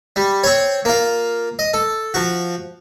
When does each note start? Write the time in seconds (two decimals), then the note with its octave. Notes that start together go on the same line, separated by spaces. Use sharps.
0.16 G3
0.44 C4 C#5
0.85 A#3 F4
1.59 D#5
1.74 A4
2.14 F3 F#4